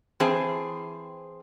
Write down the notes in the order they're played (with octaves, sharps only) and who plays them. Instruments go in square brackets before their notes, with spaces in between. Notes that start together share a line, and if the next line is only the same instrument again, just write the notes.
[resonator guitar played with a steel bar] E3 C4 G#4 C5 A5